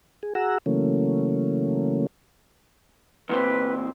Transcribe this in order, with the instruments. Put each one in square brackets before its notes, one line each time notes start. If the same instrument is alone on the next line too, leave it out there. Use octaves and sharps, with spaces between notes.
[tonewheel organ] G#4
F#4 G#4 F#5 A#5 E6
C#3 E3 F#3 A3 A#3 C#4
[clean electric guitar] E2 A#2 C4 [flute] B4